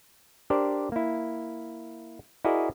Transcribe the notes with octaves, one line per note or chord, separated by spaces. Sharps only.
D4 G4 A#4 C5 D5
A#3 E4
E4 F#4 G#4 A#4 D5 D#5